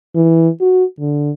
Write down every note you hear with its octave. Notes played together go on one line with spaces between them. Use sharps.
E3
F#4
D3